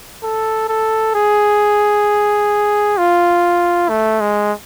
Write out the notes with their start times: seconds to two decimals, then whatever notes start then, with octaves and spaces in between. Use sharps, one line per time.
0.23 A4
0.68 A4
1.15 G#4
2.98 F4
3.89 A3
4.20 G#3